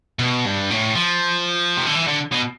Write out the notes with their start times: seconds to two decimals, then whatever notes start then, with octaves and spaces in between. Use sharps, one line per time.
0.19 B2
0.45 G2
0.70 A2
0.95 F3
1.77 C3
1.87 D3
1.95 E3
2.07 D3
2.32 B2